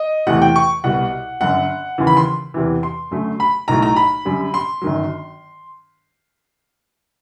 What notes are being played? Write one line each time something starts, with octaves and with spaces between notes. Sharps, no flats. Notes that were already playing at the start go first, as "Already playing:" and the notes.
Already playing: D#5
E2 C3 E3 A3 F#5
G5
C#6
C2 B2 G3 F#5
G1 F#2 D3 F#5
D#2 C#3 E3
B5
C6
E2 C3 E3
C6
F#2 D3 F#3 A3
B5
B1 A2 F#3 A3 A#5
A#5
B5
F#2 D3 G3
C6
G1 F#2 D#3 F#3